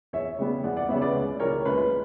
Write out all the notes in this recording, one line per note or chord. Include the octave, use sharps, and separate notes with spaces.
E2 C#5 E5
C#3 G3 B3
E2 D5 F#5
D5 F#5
C#3 G3 B3 C#5 E5
B4 D5
C#2
C#3 E3 G3 A#3 A#4 C#5
C#2 B4
B4